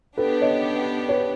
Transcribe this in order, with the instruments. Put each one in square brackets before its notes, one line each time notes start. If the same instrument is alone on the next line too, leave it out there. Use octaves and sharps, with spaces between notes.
[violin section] B3 D4 G4 [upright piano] A4 B4
[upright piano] C#5 D#5
B4 C#5